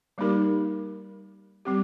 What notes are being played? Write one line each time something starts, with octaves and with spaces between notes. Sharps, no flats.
G3 A#3 D#4 G4 A#4
G3 C4 G4